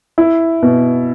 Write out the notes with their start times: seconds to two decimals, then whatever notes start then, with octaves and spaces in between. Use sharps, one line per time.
0.18 E4
0.62 B2